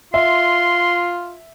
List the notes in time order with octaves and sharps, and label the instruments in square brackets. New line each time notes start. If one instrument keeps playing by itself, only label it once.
[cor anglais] F4 [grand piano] E5 [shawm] C6